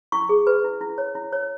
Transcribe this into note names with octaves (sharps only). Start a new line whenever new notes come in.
E4 C#6
G#4
B4
E4
E4
C#5
E4
C#5